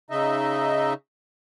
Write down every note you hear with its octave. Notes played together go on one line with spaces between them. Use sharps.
C#3 D#4 D#5 E5